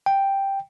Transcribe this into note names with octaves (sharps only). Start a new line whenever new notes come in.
G5